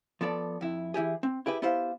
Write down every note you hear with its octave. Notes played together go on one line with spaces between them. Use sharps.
F3 B3 A4 D5
F2 E4
E3 E4 G4 G#4
C4
E4 G4 G#4 B4
B3 E4 G4 C5 F5